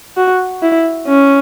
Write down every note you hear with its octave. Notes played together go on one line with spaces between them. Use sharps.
F#4
E4
C#4